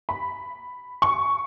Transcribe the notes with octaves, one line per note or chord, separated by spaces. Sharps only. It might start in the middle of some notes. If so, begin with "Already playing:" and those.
B5
C#6